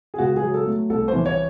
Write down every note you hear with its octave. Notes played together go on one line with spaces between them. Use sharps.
G#4
C#2 F#4
G#4
F#3
A4
A3
C2 A4
C5
E3
C#5